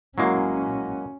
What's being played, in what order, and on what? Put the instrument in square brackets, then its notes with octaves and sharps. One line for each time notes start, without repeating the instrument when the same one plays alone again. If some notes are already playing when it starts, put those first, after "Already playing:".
[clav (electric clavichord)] F#3 G#3 A#3 [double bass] C#4 [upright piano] E4 F#4